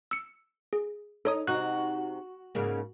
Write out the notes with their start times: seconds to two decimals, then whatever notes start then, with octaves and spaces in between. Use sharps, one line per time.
0.11 E6 C#7
0.73 G#4
1.25 D#4 A4 C#5 D#6
1.47 C3 D#4 F#4 F#6
2.55 G#2 C#3 A#3